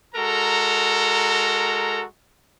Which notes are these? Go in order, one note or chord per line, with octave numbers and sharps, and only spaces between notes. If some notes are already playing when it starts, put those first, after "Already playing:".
G#3 F#4 A4 A#4 A#5